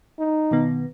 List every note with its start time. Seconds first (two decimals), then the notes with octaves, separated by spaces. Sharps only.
0.19 D#4
0.51 B2 D#3 B3